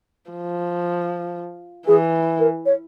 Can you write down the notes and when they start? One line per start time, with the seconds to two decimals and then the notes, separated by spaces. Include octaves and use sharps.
0.30 F3
1.87 E3 G#4
2.39 A#4
2.66 C#5